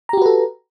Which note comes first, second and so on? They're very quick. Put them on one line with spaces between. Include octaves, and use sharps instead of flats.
A#5 G4 F#4 B4 A4